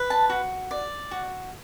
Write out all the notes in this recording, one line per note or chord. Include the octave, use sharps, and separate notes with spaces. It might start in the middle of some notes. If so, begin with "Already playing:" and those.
Already playing: B4
A5
F#4
D5
F#4